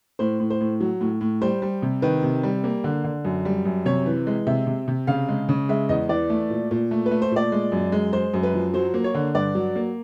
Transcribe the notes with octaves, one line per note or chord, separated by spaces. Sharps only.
A2 C5
A2
C5
A2
F#3
A2
A2
G3 C5
G3
C3
D#3 B4
C3
G3
A#3
D3
D3
F#2
G3
F#2
C3 C#5
E3
G#3
C3 E5
C3
C3
C#3 F5
G#3
C#3
G#3 E5
E2 D#5
E3 D5
A3
A#2
A#2
A3
B4
A3
C5
A#2 D5
G#3
F#2
G#3
G#3 C5
F#2
B4
F3
F#3 C5
A#3
C#5
D3
G2 D5
F#3
A#3